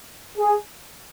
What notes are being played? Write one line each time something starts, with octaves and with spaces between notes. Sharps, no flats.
G#4